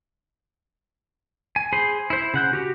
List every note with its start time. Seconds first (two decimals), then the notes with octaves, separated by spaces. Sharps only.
1.56 G#5
1.73 G#4 C5 G#5 B5 C6
2.10 E4 C5
2.34 C#3 F#5 G6
2.53 F#4 G4